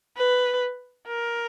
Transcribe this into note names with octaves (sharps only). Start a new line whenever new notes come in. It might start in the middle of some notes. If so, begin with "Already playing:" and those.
B4
A#4